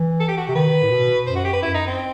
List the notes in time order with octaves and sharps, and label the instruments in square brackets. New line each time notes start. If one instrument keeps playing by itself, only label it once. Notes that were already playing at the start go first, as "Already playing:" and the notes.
Already playing: [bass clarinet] E3
[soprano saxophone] A4
G4
F#4
[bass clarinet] C3 [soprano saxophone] G4
[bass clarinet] D#3 [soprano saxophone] B4
[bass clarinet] A2
B2
[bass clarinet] F#2 [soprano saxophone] C5
[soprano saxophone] F#4
G4
B4
[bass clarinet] F#2 [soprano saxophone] E4
[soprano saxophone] D#4
C4